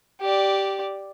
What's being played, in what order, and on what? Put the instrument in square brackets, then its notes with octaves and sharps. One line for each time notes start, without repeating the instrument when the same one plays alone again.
[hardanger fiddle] G4 D5